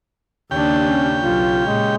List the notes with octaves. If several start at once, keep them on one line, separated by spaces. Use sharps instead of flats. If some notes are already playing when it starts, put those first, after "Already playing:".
D#2 C#3 D4 G4 G5
C#4
B1 F4
A#2 G#3